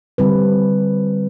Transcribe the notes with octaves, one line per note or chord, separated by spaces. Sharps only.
D3 G3 C4 E4 B4